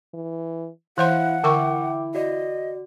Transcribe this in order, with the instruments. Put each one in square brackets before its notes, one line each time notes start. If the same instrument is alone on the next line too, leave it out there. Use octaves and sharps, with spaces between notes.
[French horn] E3
[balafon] E3 C5 C6 [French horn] E4 [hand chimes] F5 F#6 [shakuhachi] F#5
[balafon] D3 A#4 C#6 [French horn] E4 [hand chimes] E5 G5 D6
[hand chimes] F#4 D5 [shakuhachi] D#5